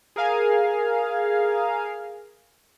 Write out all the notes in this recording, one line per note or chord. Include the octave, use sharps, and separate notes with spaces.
G#4 A#4 F5 G#5